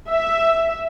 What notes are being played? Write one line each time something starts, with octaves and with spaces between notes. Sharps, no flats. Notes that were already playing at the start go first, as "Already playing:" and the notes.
E5